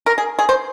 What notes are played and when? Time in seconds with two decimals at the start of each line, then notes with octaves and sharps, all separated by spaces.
0.06 A#4
0.18 G#4
0.39 G#4
0.49 C5